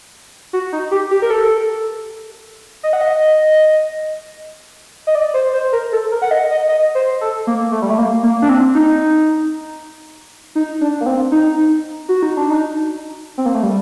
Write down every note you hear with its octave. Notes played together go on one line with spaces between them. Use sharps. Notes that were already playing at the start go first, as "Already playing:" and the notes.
F#4
D#4
G4
G4
A#4
A4
D#5
F#5
D#5
D#5
D5
C5
C5
A#4
A4
A#4
F#5
D#5
D#5
D#5
C5
A4
A#3
A3
G3
A3
A#3
A#3
D4
C4
D#4
D#4
D4
A#3
C4
D#4
F#4
D#4
D4
D#4
C4
A#3
A3
G3